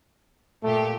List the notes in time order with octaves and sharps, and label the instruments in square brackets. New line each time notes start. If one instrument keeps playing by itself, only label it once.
[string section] A#2 G4 [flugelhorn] A3